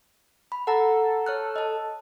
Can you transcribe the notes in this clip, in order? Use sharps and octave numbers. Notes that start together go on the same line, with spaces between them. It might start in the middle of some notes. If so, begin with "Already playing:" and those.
B5
A4 F#5 A#5
C#5 F6 F#6
D#5 A5